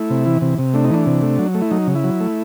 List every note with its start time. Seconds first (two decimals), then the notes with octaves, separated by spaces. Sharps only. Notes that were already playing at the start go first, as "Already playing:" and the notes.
Already playing: A3 E4
0.10 C3
0.26 E3
0.41 C3
0.59 C3
0.74 A3 D4
0.84 D#4
0.91 E3 D4
1.06 C3
1.22 A3
1.39 F#3
1.55 A3
1.61 E4
1.71 F#3 D#4
1.87 C#3
1.95 E4
2.04 F#3
2.20 A3